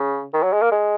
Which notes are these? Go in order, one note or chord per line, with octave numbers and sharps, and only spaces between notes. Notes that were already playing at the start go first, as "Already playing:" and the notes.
Already playing: C#3
D#3
F#3
G#3
A#3
G#3